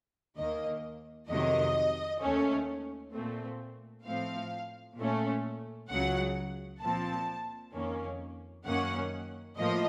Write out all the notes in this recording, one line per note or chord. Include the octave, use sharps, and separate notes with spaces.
D#2 D#3 A#3 D#5
F2 C3 D#3 F#3 D#5
D#2 D#3 A3 C#4
A#2 A3 C4
A2 F3 C4 F5
A#2 A3 C#4
C#2 C#3 F#3 F#5
A#2 F3 C4 A5
F2 D#3 A#3 C#4
F#2 D#3 A#3 C#4 F#5
A2 F3 A#3 D#5